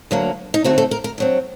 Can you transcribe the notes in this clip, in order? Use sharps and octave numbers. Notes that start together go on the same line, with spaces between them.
D2 D3 F#3 A#3
D#4
D#2 D3 F#3 A3 C4 F#4
A4
A#4
A#4
G2 F#3 C4